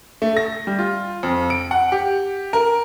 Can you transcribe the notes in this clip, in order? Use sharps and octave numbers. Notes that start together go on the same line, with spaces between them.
A3
A#6
G3
F4
F2
D7
F#5
G4
A#4